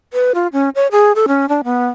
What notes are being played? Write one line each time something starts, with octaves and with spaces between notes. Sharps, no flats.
B4
F4
C#4
C#5
G#4
A4
C#4
D4
B3